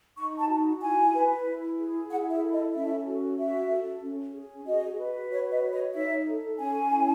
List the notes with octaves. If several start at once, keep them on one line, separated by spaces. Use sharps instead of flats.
D#4 C#6
A5
F#4
E4 G#5
B4
E4
G#4
E4 F#5
E5
A4
D#5
C#4 E5
F#4
F#4 E5
A4
C#4
G#4
F#4 D#5
B4
F#4 C#5
D#5
C#5
D#5
D#4 E5
A4
C#4 G#5
E4